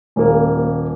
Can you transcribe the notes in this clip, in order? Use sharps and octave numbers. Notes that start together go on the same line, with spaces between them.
D#1 A#3